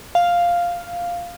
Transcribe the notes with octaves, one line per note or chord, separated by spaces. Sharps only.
F5